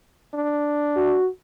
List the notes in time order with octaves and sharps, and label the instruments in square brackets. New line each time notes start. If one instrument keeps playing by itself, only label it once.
[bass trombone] D4
[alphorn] F#4